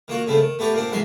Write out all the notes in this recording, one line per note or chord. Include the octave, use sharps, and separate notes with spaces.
D#3 A#3 F4 F#4
C#3 A3 B3 C4
D#3
A3 B3 G4 A4 C#5
A#2 A#3 C4 D4
B1 G#2 E3 F#3 E5 C6